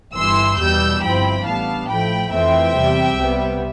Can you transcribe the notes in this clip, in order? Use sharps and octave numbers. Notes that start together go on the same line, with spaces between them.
G1 G2 E3 C6 E6
E2 B2 G3 E6 G6
G1 G2 F3 C4 E4 G5 B5
A1 A2 G3 B3 D4 F5 A5
A2 F3 A3 G5 B5
F2 E3 A3 C4 E5 G5
E2 C3 G3
C2 C3 G3 B3